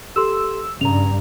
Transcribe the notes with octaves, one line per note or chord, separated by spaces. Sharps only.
G4 A4 C6 E6
G2 C#3 A#5 F7